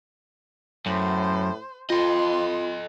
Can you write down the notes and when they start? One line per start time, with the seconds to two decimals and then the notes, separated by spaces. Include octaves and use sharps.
0.86 F#2 A2 C5
1.90 F2 F4 A4 D#5 C6